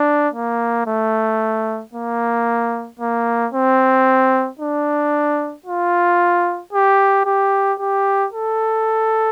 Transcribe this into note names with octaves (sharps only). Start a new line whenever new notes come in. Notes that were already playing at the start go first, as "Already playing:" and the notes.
Already playing: D4
A#3
A3
A#3
A#3
C4
D4
F4
G4
G4
G4
A4